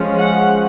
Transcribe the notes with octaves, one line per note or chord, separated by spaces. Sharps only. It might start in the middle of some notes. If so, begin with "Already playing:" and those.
Already playing: F3 G#3 C#4
F#5